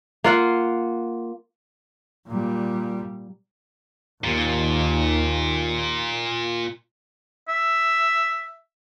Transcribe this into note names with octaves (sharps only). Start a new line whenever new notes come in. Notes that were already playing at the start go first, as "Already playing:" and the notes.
A#3 F4 F#5
A#2 G3
D#2 A#2
E5